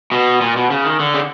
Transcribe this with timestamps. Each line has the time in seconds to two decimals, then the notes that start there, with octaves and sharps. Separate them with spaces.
0.12 B2
0.41 A#2
0.56 B2
0.70 C#3
0.85 D#3
1.00 D3
1.14 C#3